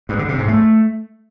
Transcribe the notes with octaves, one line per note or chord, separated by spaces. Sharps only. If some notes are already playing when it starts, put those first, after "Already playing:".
G2
D3
C3
G#2
A3